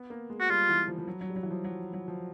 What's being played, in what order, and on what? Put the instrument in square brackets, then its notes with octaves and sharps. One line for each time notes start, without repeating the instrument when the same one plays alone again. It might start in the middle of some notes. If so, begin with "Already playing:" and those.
Already playing: [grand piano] B3
A#3
G#3
[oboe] F#4
[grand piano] G3 [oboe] F4
[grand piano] E3
F3
F3
F#3
F#3
G3
F#3
E3
F3
F#3
F#3
F3